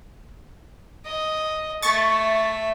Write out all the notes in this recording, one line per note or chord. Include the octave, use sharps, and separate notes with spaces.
D#5
A3 E5 C#6 A6